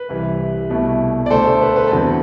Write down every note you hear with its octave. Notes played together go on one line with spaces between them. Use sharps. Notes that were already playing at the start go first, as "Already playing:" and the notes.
Already playing: B4
C2 C3 E3
C2 B2 A3 E4
D5
D2 D3 A3 D4 A4 C5
A4
B4
B4
A4
E2 D3 F#3 C4 B4